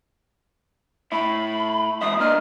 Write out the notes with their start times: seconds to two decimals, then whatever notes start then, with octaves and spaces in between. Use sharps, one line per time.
1.12 A2 E4 B5
2.01 E2 G#3 E5 D#6
2.20 A#3 D4 D#5 F6